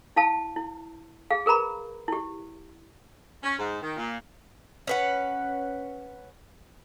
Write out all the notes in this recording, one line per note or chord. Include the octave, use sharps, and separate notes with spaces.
E4 F5 A5
E4
G#4 F5
G#4 A#4 B4 A#5 B5
E4 G4
C#4
G#2
D#3
A#2
C#4 B4 F#5